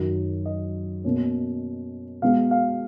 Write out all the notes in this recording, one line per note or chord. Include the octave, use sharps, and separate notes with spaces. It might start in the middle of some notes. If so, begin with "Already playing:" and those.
Already playing: F#2 D#3 F#3
D#5
B2 A#3 C#4
B2 G#3 B3 F5
F5